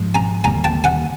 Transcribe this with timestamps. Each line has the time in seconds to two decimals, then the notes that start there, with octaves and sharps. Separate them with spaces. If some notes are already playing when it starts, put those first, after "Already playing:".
Already playing: G#2 F3 G#3
0.15 G#5 A#5
0.44 D#2 D3 G3 A#3 G#5 A#5
0.64 G5 A5
0.84 F#5 G#5